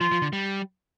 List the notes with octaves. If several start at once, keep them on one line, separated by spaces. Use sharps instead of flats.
F3 F4
F3
D3
G3